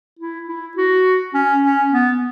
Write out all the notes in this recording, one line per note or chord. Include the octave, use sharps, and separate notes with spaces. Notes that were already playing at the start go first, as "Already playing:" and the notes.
E4
E4
F#4
C#4
C#4
B3